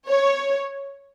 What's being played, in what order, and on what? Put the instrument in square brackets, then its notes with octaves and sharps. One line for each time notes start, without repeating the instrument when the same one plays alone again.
[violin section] C#5